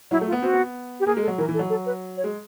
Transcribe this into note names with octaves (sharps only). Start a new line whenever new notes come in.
F#3 E4
A3
F4
B3
C4 F#4
B3
G4
A#3 G#4
G#3
A4
F#3
E3 A#4
E3
A4
F#3
A4
B4
C#5
G#3